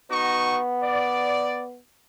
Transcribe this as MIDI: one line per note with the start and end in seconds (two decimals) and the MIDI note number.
0.10 1.79 59
0.10 0.60 63
0.10 0.60 66
0.10 0.60 85
0.82 1.64 74